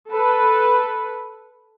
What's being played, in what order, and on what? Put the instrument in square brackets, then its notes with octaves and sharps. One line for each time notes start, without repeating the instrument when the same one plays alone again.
[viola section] A4 B4